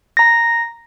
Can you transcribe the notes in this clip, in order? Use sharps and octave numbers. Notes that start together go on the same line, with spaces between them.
A#5 A#6